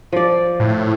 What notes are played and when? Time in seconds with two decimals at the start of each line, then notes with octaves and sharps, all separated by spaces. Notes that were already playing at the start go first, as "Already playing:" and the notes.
0.12 F3 D5
0.60 A2